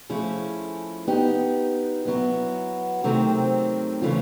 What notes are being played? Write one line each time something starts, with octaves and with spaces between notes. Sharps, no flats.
F3 A3 C#4 E4 G#4
B3 D#4 G4
F#3 B3 E4
C3 D#3 F#3 A3 C4
C#3 E3 A3 C#4 F4